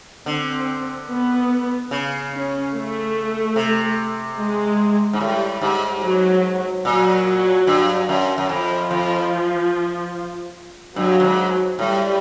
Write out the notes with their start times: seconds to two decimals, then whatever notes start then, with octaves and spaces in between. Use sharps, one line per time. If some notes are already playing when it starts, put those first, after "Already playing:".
0.26 D3 C4
1.09 B3
1.91 C#3
2.32 C#4
2.73 A3
3.56 C3
4.38 G#3
5.13 G#2
5.21 A2 G3
5.62 G#2
6.03 F#3
6.85 A#2 F#3
7.67 G2
8.09 F#2
8.38 F#2
8.49 F2 F3
8.91 F2
10.96 G2 F#3
11.20 G2
11.24 G#2
11.79 A2 G3